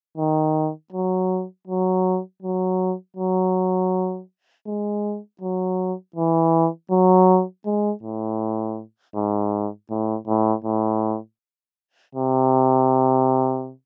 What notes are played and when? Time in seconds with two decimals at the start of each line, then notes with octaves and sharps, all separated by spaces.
0.17 D#3
0.92 F#3
1.67 F#3
2.42 F#3
3.17 F#3
4.67 G#3
5.41 F#3
6.16 E3
6.91 F#3
7.66 G#3
8.03 A2
9.16 G#2
9.90 A2
10.27 A2
10.65 A2
12.15 C3